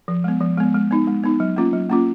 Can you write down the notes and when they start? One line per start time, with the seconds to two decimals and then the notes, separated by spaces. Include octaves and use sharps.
0.08 F3
0.24 G#3 B3
0.41 F3
0.58 G#3 B3
0.74 G#3
0.91 B3 D#4
1.07 G#3
1.24 B3 D#4
1.40 F#3
1.56 A#3 C#4 F4
1.73 F#3
1.90 A#3 C#4 F4